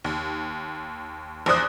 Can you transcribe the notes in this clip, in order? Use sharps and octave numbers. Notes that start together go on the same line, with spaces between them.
D#2
A#1 E2 C5 D#6 F#6